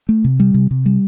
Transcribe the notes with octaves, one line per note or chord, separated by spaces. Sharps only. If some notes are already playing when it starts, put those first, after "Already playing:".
A3
C3
G3
C3
C3
G3